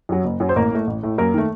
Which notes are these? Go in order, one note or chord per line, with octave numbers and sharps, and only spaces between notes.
F#2 F#3
F#1
F#2 F#3
C5
A1 A#3 A#4
A2 A3
A1
A2 A3
F#2 A#3 A#4
D#3 A3